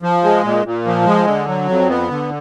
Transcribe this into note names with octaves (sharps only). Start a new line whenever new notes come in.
F3
G#3
A#2
A#2
F3
G#3
D3
F#3
F2
B3
D3